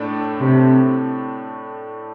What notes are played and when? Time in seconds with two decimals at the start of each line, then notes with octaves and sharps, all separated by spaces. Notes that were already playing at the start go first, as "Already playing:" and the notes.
Already playing: A2 A3 D4 A4 D5
0.39 C3